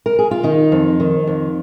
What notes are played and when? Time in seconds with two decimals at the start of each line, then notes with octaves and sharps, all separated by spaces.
0.06 A#4
0.19 G#4
0.31 F4
0.43 D#3 D#4
0.72 F2
1.00 D#3
1.27 F2